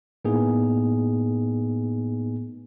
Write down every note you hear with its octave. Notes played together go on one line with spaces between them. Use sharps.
A2 A#3 B3 D#4 G#4